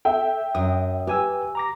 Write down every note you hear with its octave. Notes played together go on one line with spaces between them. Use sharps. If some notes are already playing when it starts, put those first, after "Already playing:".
A4 E5 G5
F#2 D#6
G4 B4 G#5 E6
A#5 D6 A#6